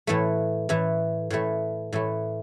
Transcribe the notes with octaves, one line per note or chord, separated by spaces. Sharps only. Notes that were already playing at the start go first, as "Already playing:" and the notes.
A2 E3 A3
A2 E3 A3
A2 E3 A3
A2 E3 A3